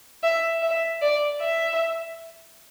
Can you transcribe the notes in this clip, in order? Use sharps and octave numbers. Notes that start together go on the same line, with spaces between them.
E5
E5
D5
E5